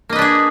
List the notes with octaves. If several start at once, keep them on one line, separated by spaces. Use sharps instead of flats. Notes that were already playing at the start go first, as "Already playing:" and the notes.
A#3 D4 G#4 B4 D#5